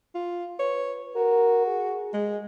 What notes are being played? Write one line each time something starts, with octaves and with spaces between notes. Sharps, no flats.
F4
B4 C#5
F#4 A#4
G#4
G#3